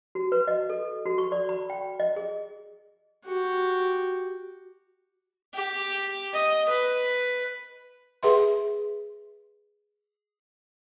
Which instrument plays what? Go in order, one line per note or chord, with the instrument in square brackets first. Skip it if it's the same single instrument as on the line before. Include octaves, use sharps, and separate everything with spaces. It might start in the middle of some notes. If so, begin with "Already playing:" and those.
[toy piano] F#4
B4
D#5
A4
F#4
C#6
D5
B5
G5
D#5
G#4
[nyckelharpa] F#4 G4
G4
D#5
B4
[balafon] G#4 B4 E5 C6